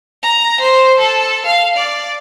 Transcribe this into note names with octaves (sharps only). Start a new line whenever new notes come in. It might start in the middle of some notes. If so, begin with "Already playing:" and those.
A#5
C5
A4
F5
D5